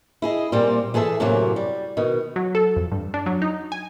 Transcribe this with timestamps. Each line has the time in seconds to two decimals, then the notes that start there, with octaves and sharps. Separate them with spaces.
0.22 E4 G#4 D#5
0.52 A#2 G3 A#3 C4
0.94 E3 G#4 A4 C5 E5
1.20 F#2 A2 C3 F#3 A#3
1.56 G3
1.97 B2 D#3
2.36 F#3
2.55 A4
2.76 F2
2.92 G2
3.14 D4
3.26 F#3
3.42 D#4
3.72 G#5